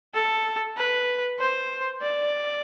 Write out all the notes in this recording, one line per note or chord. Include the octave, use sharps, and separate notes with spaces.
A4
B4
C5
D5